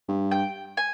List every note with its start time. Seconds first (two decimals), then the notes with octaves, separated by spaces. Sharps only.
0.09 G2
0.31 G5
0.77 G#5